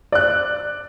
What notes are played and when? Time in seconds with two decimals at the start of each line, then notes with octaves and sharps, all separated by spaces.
0.12 D5 F#6